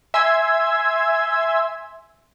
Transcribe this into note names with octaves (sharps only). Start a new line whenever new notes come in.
E5 G#5 C6 E6 G#6